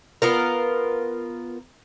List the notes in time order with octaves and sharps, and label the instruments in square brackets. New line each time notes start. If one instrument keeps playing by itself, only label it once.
[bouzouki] B3 F4 A#4